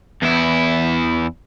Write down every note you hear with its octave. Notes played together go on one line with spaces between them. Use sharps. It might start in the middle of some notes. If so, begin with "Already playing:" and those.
E2 E4